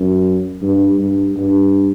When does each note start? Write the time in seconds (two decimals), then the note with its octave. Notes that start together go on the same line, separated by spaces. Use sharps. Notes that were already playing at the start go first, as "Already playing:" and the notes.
Already playing: F#2
0.62 G2
0.99 G2
1.37 G2